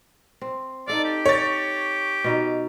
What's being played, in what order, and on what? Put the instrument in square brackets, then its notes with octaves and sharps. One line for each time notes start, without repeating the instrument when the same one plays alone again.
[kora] C4
[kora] D#4 A4 F5 [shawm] D5
[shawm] G4
[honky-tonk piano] C#5 A6
[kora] B2 D#4